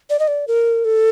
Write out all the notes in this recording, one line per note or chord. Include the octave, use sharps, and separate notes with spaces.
D5
D#5
D5
A#4
A4